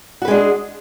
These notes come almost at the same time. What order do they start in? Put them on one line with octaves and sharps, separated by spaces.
F#4 B4 G#3 D4 G#4